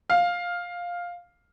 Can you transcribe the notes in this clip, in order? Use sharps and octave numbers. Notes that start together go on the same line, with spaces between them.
F5